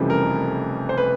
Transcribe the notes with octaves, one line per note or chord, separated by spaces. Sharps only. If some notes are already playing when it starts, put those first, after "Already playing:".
Already playing: F1 F2 C#3 E3 G3
A#4
C5
B4